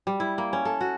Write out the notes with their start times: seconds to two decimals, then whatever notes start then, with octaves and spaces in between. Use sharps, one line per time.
0.07 G3
0.20 E4
0.38 A#3
0.53 C#4
0.65 A4
0.81 F#4